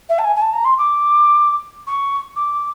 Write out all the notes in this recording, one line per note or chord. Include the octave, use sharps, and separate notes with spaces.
E5
A5
G#5
G#5
A5
A#5
C6
D6
C#6
D6